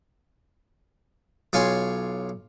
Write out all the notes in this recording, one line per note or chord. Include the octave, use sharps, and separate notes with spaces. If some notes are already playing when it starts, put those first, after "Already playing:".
B1 F4 C#5 G#5 C6